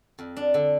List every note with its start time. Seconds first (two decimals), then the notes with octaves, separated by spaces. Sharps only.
0.19 F2
0.37 D4
0.54 D3